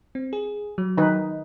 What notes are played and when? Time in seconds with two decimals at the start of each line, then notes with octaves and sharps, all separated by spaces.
0.15 C4
0.33 G#4
0.78 F#3
0.97 D#3 D#4 B4